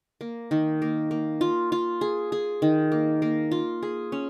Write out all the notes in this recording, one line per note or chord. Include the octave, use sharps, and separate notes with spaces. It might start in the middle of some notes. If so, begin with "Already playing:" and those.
A#3
D#3
A#3
A#3
F4
F4
G#4
G#4
D#3
A#3
A#3
F4
G#4
C#4